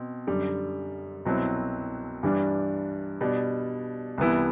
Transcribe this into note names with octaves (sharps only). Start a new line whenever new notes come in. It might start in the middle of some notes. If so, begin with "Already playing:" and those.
Already playing: B2 C4
F#2 D3 G3
C2 B2 F#3 C4 E4
G2 E3 G3 D4
B2 G3 D4
C2 C3 E3 B3 E4